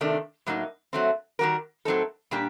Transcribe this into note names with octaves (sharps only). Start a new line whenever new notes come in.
C3 D#3 A3 D4
A2 F#3 A#3 D#4
F#3 A3 C4
D#3 G3 A#3 F#4 A#4
A2 F#3 C4 D#4 A4
A#2 G3 D4 G4